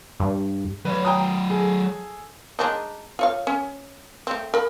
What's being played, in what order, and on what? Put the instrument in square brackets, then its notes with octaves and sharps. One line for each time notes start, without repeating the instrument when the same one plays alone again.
[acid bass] G2
[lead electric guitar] F#3 D5 [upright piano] B4 C#5
[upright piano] G5 A#5 D#6
G#4 A4
[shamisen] G#3 D4 D#4
F4 C#5 F5
C#4
A3 C4
A#4 B5